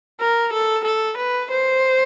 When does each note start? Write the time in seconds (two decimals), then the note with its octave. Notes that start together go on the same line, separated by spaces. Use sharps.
0.20 A#4
0.53 A4
0.85 A4
1.18 B4
1.51 C5